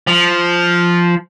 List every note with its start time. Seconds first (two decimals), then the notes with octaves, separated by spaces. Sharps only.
0.07 F3